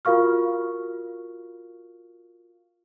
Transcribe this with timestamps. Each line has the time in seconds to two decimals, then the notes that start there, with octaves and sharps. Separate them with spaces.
0.05 F4 F#4 A#4 F5 C#6 F6